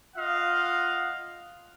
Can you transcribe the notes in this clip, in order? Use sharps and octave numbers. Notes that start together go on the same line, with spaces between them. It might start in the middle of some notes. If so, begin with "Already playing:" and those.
F4 D#5 F5 F#5